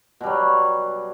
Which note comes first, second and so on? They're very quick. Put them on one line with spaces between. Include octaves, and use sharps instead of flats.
B2 G3 F#3